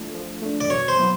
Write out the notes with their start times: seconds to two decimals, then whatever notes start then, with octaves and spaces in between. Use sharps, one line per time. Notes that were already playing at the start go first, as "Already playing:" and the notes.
Already playing: F3 A3 D4
0.14 F3
0.42 A3 D4
0.60 D5
0.70 B2 C#5
0.88 C5
0.98 F#3 B3 E4